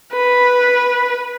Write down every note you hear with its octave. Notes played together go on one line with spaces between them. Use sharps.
B4